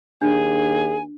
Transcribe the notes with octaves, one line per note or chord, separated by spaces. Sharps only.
D#2 D4 G#4 G#5